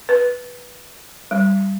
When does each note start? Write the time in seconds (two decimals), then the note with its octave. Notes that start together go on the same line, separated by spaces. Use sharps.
0.09 B4
1.31 G3